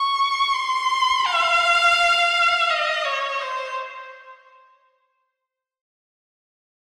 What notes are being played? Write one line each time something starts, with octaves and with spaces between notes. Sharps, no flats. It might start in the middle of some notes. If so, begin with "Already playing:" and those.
Already playing: C#6
C6
F5
D#5
C#5
C5